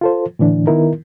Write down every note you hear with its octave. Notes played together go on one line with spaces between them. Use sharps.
F4 A4 C5
A2 D3 E3 D4
D#3 B3 D#4 E4 A#4